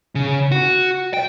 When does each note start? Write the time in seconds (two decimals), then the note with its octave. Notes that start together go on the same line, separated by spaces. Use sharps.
0.15 C#3
0.52 F#4
1.14 G5